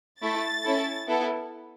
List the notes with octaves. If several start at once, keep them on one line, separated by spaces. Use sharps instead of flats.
A3 E4 A4 A6
C#4 E4 A4
B3 E4 A4